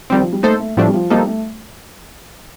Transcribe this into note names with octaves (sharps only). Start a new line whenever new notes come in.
D#3 F3 G3 C4
F3
G3
A3 A#3 D#4 A4 C5
A3
A2 F3 G3 A3 D4
G3
F3
F3 G3 A#3 D#4 A4
A3